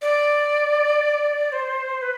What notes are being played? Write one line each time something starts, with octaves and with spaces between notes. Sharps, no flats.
D5
C5
B4